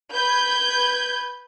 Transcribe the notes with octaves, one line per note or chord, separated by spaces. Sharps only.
B4 G6 G#6